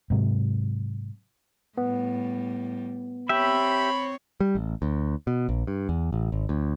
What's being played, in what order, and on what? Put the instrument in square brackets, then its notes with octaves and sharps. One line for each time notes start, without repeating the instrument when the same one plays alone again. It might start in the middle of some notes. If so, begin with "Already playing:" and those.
[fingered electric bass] G#2 C3 F#3
[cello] A2 G3 [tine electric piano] B3
[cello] C4 C#5 [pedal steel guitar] G4 E5 [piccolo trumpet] B5
[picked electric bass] G3
A1
D2
B2
A#1
G2
E2
A1
G#1
D2